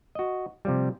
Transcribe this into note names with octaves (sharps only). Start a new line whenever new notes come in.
F#4 D#5
C3 F3 G3